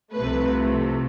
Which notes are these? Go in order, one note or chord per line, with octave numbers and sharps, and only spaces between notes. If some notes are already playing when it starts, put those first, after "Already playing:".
C2 C3 F3 A3 B4